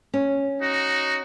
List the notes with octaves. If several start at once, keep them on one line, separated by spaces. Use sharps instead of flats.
C#4
D#4 F#4